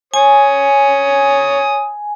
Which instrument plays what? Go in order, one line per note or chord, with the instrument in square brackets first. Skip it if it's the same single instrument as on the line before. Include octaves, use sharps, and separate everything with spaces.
[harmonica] C#5 D#6 [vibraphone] G#5